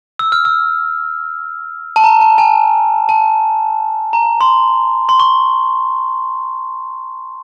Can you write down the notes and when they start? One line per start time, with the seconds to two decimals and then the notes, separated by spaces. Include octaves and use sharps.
0.19 E6
0.32 F6
0.45 E6
1.96 A5
2.04 A#5
2.21 A5
2.38 G#5
3.09 A5
4.13 A#5
4.41 C6
5.09 C6
5.20 C#6